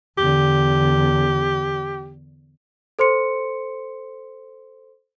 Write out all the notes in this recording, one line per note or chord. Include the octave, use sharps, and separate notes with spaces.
E2 D3 G4
A4 C5 C6 C#7